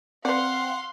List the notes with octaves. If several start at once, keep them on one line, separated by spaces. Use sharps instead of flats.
C4 B4 D5 F5 F#5 C6